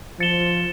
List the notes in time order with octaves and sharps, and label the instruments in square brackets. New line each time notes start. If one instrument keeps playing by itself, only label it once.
[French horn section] F3 [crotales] A6 C#7 E7 G7